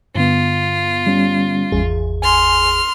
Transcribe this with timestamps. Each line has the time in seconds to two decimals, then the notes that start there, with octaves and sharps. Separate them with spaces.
0.16 G2 D3 B3 F4
1.06 G3 C#4
1.72 G#1 E2 G#4
2.22 G#5 C6 F6